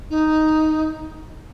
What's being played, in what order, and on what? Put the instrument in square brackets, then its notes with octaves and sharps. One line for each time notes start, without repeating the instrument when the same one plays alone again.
[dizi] D#4